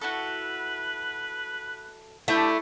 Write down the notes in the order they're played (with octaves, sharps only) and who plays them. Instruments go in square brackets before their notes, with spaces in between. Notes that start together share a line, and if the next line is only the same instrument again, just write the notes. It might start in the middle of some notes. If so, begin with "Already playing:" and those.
[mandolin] E4 F#4 A4 [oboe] B4
[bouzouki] A3 [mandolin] D4 G4 A5 [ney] E4